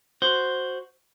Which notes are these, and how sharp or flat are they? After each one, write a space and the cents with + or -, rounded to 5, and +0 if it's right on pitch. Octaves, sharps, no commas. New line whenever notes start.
F#4 +0 C5 +0